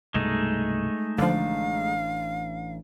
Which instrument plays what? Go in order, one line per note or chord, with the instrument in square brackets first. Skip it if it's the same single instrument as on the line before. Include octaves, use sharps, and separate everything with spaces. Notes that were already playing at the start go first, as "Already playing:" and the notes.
[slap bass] C2 G2 B2 [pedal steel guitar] G#3 A3 D#4
[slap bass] A1 D4 [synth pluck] D3 F3 [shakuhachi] F5